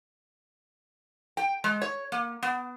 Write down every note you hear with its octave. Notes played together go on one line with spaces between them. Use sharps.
G5
G#3
C#5
A#3
B3